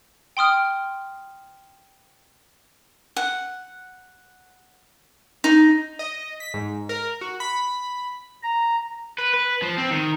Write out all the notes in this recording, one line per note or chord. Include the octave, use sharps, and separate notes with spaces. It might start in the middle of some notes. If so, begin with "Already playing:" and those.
G5 C6 D#6 F6
F#5
D#4
D#5
B6
G#2
A#4
F#4
B5
A#5
B4
B4
F3
C4
D#3